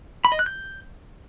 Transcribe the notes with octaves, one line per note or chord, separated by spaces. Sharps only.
B5
D#5
F#6
G6